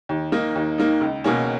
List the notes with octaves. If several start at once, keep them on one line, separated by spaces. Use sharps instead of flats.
D#2
D#3 A#3 D#4
D#2
D#3 A#3 D#4
C#2
B2 A#3 C#4